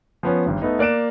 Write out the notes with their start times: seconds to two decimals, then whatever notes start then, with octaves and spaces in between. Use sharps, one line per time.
0.23 F3 B3 C#4
0.46 G#1 G2
0.62 A3 B3 D#4
0.79 A#3 D5 F#6 D7 E7